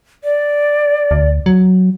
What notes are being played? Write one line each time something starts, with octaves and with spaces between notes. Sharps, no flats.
D5
D2
F#3